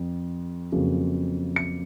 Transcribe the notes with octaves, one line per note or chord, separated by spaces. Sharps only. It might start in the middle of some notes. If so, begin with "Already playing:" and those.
Already playing: F2
F2 C#3 F#3 A#3
C#7